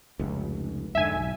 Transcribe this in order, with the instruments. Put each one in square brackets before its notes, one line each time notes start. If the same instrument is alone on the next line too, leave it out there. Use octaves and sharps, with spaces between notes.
[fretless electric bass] F1 C#2
[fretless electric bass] F2 G#2 D3 [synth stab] E5 G#5
[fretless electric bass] B1